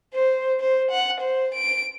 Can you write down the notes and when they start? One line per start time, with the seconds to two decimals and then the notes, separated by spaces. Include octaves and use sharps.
0.14 C5
0.60 C5
0.91 F#5
1.21 C5
1.54 D7